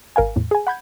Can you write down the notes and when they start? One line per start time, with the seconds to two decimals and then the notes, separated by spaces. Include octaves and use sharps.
0.16 G#1 A#4 F5 G#5
0.36 E2 A2
0.51 G#4 G#5
0.67 F#5 B5 G6 G#6